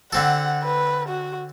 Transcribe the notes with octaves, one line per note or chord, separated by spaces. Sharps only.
D3 C4 A4 F#5
B4
F#4